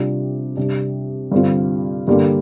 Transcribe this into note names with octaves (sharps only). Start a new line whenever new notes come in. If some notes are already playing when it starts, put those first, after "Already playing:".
Already playing: C3 G3 D4 F4
C3 G3 D4
G2 D3 G3 C4 F4
G2 D3 G3 A#3